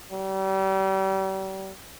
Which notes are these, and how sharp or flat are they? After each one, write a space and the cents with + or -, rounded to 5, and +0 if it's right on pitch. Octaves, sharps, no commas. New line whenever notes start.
G3 -35